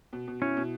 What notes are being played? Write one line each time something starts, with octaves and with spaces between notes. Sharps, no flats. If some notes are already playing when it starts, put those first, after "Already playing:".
B2
B2
C#4 E4
B2